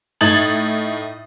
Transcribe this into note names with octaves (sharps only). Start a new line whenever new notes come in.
A2 D#4 D#6 G#6 A6 F#7